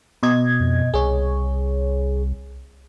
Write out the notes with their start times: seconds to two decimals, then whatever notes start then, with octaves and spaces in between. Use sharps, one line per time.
0.23 B2 D#5 G#6
0.60 F2
0.94 C2 G#4 C#5